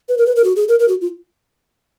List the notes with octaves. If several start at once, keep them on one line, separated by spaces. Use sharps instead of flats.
B4
A#4
B4
A#4
F#4
G#4
A#4
A#4
F#4
F4